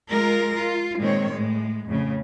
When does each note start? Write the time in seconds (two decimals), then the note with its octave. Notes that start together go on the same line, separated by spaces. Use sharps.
0.12 G#3 F4 A#4
0.57 F4
1.00 A#2 D#3 G#3 C4 C#5
1.33 A2 G#3
1.88 F2 A2 C#3